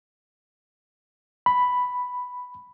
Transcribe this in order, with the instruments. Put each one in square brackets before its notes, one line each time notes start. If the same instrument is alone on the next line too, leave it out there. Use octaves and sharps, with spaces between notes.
[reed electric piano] B5